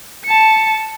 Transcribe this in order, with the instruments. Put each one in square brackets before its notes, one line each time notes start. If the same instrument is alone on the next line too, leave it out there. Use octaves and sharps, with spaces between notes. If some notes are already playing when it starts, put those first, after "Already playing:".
[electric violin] A5 C#7